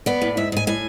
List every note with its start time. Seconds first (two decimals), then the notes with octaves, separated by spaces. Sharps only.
0.06 B3 D5
0.22 A2
0.37 G#2 E5
0.52 G#2 G#5
0.67 A2 G#5